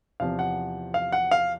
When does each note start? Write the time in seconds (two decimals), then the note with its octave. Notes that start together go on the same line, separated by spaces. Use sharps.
0.20 E2 C3 F3 F5
0.39 F#5
0.94 F5
1.12 F#5
1.31 F5